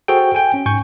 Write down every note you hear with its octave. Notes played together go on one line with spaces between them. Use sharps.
F#4 G#4 A4 C5 G5
G5 G#5
C#4
G#2 G#5 C#6 G6